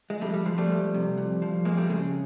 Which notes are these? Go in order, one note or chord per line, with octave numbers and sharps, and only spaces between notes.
G#3
F2 G3 A3
G3
F3 G#3
G3 A3
F2
C3
F2
F3
F2 G#3 A#3
G3 A3
C#3 G#3